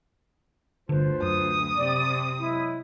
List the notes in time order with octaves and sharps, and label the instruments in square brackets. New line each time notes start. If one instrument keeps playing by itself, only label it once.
[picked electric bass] G1 D3 [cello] D2 [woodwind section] F4 B4 C5
[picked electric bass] F#2 [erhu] D#6
[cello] C3 [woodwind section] D5
[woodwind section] F#3 G#3 E4